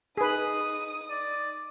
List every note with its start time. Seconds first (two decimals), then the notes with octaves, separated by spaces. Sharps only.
0.17 D#4 G#4 B4 D#6
1.10 D5